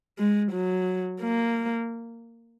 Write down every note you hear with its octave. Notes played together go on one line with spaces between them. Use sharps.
G#3
F#3
A#3